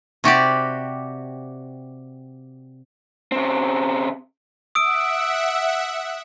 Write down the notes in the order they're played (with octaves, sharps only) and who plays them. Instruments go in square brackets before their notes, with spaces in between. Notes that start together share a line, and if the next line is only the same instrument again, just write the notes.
[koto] C3 F#4 G4 D5
[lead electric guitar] C#3 C4
[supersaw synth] E5 F#5 [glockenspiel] D#6 E6 D7